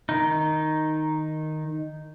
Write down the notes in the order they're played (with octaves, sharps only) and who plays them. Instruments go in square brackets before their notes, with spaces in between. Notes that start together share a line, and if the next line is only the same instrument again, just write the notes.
[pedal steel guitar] D#3 D#4